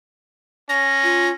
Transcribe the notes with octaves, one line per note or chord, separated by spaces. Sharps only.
C#4 A#6
F4